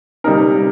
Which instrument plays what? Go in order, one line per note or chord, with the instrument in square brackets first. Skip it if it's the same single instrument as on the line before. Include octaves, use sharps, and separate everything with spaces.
[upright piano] C3 G3 A#3 D#4 A#4